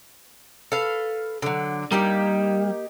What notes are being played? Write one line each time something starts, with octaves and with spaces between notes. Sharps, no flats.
A4 B4 F5
D3 F#3
G3 A#3 D#4 G4